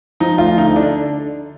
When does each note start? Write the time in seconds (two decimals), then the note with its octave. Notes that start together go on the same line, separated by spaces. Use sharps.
0.20 F3 D#4
0.38 D2 F4
0.57 D3 D#4
0.76 D3 D4